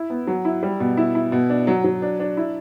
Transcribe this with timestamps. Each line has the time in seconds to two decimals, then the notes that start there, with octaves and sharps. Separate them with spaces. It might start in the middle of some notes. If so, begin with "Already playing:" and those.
Already playing: E4
0.10 B3
0.27 F#3
0.45 E4
0.63 G3
0.80 B2
0.97 E4
1.15 E4
1.32 B2
1.50 D4
1.67 F#3
1.84 F#3
2.02 D4
2.20 D4
2.37 E4